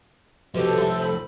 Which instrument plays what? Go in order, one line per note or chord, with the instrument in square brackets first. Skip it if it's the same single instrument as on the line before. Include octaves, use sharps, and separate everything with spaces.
[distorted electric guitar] C2 F3 [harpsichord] B2 G4 [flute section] A4 C5
[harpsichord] C3 G3
B5